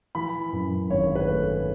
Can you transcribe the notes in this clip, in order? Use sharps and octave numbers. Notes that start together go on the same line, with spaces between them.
E3 B5
F#2
G#1 C#5
B4
A3